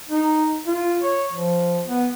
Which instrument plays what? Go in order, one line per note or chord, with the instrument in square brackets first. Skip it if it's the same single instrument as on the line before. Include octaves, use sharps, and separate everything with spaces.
[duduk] D#4
F4
C#5
F3
B3